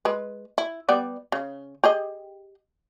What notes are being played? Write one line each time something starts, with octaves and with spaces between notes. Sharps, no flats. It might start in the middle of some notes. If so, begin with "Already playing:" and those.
G#3 B4
E4
G3 B3 D5
C#3
G4 G#4 D#5